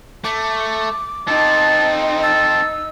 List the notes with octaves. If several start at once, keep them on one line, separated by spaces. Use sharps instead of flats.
A3 D6
C4 D#4 A4 A5
A5 E6